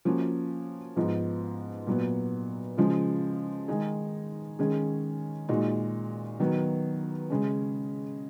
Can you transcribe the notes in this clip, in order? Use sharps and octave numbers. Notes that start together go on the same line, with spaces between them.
F3 A#3 C#4 F#4
G#2 F3 B3 D#4
A#2 F#3 B3
C#3 F3 G#3
D#3 G#3 D#4 G#4
D#3 G#3 C#4 G#4
A#2 G#3 D#4 F#4
D#3 F#3 B3
C#3 G#3 C#4